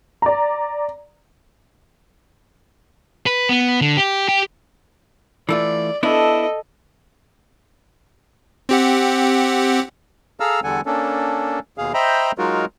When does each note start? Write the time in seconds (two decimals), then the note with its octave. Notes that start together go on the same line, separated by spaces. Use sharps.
0.22 D5 A#5
3.26 B4
3.49 B3
3.81 D3
3.97 G4
4.29 G4
5.49 E3 A3 F4 D5
6.03 B3 D4 E4 A4 D#5
8.69 C4 G4 F#5
10.40 G#4 A4 F5 A#5 E6 F6
10.64 E2 D3 G3 A4 F#5 G#5
10.86 A#3 C#4 D4 A4
11.78 D#2 B2 G#4 F5
11.94 C5 D#5 E5 G5 A#5 B5
12.38 F#3 G#3 D#4 F4 F#4 A#4